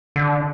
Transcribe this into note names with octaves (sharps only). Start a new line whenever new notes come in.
D3